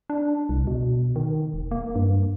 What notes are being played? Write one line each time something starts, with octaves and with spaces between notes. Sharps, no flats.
D4
C2
B2
D#3
E1
A#3
G2